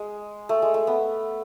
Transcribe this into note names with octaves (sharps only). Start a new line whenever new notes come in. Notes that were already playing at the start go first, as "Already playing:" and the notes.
Already playing: G#3
A3
G#3
A3
B3